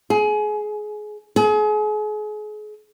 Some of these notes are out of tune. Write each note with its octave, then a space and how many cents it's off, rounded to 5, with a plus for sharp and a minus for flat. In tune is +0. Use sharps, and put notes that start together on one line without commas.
G#4 +25
G#4 +35